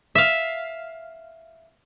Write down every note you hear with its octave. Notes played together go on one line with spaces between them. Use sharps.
E5 F5